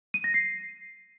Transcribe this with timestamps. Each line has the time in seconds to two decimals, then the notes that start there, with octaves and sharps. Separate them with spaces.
0.14 D#7
0.24 A#6
0.34 C7